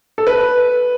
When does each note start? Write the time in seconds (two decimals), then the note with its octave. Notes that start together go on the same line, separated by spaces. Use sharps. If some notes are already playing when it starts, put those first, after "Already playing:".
0.18 A4
0.27 B4